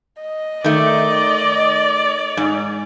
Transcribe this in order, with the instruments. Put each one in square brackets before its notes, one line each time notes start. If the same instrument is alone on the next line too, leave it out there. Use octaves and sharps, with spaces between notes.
[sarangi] D#5
[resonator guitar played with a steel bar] D#3 A3 [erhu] D5
[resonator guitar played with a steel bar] G#2